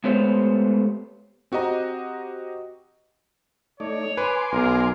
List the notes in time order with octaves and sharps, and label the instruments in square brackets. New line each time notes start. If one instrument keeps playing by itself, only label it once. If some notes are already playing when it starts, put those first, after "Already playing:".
[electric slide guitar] G#3 A3 B3 G4 C5 C#5
[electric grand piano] C4 F#4 G4 D#5 A#5
[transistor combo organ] A3 D#4 D5 [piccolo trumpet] C#5
[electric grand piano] B4 [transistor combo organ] G#5 C6 D6
[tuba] B1 [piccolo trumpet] A#4